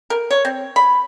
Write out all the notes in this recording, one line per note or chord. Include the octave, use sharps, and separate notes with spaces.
A#4
C#5
C4
B5